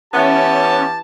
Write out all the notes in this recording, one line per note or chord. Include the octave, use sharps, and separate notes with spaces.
E3 B3 C#4 G4 A5